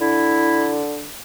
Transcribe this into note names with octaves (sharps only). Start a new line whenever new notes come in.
D3 E4